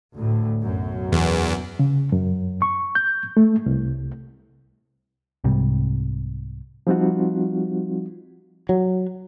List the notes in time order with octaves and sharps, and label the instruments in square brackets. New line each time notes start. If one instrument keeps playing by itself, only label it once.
[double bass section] D2 A2
B1 F#2
[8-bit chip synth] E2
[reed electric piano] C#3
F#2
C#6
G6
A3
C2
[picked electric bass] C2 G#2 C3 G3
[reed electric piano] F3 G3 C4 D#4 F4 F#4
[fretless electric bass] F#3